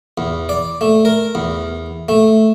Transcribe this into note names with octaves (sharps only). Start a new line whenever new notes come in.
E2
D5
A3
A#4
E2
A3